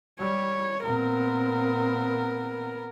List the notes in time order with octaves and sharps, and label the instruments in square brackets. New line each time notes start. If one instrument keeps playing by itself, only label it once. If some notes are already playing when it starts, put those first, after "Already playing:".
[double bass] G3 [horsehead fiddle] C#5
[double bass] A#2 C4 [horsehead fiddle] B3 A#4